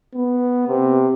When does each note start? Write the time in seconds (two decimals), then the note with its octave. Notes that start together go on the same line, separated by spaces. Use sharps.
0.15 B3
0.68 C3